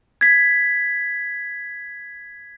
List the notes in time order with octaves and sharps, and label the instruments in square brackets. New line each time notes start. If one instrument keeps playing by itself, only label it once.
[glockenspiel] G#6 B6